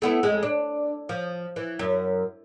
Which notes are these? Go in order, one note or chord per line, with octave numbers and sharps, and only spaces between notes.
A3 B3 E4
F2 G#3
D4
F3
E3
F#2